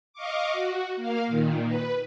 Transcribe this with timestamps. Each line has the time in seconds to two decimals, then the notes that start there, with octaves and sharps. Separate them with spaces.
0.13 D#5 F5 C#6 D6
0.53 F#4
0.96 A#3 F5
1.27 A#2 D#3
1.67 B4